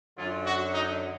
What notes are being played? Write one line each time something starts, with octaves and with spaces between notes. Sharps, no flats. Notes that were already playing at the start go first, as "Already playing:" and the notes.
F#2 D3 F#3 F4
F#4
D#4